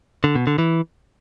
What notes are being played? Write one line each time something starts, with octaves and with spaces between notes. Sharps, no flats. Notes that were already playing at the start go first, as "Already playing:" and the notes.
D3
B2
D3
E3